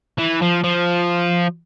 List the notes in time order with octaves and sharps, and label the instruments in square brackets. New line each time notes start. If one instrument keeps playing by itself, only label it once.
[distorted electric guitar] E3
F3
F3